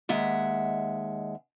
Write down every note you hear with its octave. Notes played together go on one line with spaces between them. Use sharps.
D#2 G#3 E5 F#5